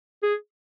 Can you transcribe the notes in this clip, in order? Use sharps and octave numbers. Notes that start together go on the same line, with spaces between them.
G#4